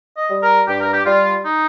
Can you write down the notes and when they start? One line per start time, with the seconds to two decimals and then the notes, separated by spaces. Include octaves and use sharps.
0.17 D#5
0.31 G3
0.43 A#4
0.68 G2 G4
0.81 A#4
0.93 G4
1.06 G3 F4
1.44 D#4